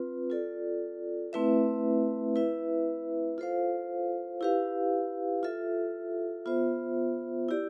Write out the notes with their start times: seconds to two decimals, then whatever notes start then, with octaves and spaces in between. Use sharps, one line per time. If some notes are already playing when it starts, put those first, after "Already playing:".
Already playing: C4 F4 B4
0.30 F4 A4 D5
1.33 A3 C4 E4 B4 E5
2.36 E4 B4 E5
3.38 F4 A4 C5 F5
4.41 E4 G4 B4 F5
5.43 F4 A4 E5
6.46 B3 F4 C5 E5
7.49 E4 G4 D5